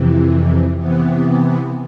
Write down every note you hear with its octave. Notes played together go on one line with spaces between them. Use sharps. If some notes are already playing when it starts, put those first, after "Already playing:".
Already playing: F2 C3 E3
C3 E3 B3